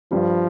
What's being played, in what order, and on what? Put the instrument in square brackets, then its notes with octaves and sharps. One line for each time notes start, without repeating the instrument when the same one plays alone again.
[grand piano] G2 G3 [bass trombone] F3